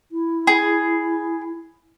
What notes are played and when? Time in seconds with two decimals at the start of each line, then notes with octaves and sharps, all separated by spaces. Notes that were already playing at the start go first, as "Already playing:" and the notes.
0.12 E4
0.47 G#4